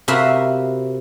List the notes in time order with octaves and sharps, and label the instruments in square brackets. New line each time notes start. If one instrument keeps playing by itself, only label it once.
[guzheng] C3 F#4 A#4 E5 F5 B5